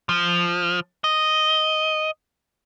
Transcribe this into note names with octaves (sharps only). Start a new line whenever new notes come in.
F3
D#5